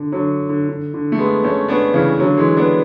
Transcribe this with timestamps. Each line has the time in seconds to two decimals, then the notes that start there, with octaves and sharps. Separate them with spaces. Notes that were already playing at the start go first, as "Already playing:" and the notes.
Already playing: D3
0.12 D3 F#3
0.49 D3
0.68 D3
0.94 D3
1.12 A3
1.18 G#3 B3
1.44 A3 C#4
1.68 B3 D4
1.93 C#3 E3
2.19 D3 F#3
2.37 E3 G#3
2.57 B3 D4